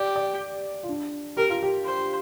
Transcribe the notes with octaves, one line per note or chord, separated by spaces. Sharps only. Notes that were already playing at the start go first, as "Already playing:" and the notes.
Already playing: G4 D5
D5
F4
D4
G4 A#4
F4
G4
C5